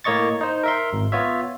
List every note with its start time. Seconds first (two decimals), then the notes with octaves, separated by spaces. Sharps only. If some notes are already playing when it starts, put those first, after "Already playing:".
0.04 A2 A#3 C#5 D#5 C#6 A6
0.41 D#4 C5
0.63 A#4 E5 C6
0.93 G#1
1.12 B3 F4 C#5 E5